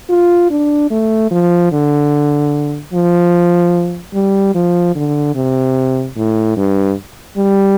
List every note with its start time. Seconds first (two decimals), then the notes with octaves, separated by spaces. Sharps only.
0.10 F4
0.51 D4
0.91 A3
1.31 F3
1.72 D3
2.93 F3
4.14 G3
4.55 F3
4.95 D3
5.35 C3
6.17 A2
6.57 G2
7.38 G3